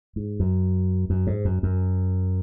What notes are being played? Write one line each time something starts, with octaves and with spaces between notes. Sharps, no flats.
G#2
F#2
F#2
G#2
F#2
F#2